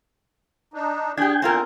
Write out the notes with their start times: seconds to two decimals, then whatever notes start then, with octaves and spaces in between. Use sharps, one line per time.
0.74 D4 D#4
1.17 D4 G4 G#4 G5 G#5
1.42 E2 C4 F4 A#4